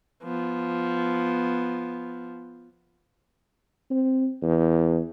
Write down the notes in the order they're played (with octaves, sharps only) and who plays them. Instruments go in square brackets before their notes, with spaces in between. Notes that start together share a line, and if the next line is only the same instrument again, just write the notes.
[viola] F3 B3
[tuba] C4
E2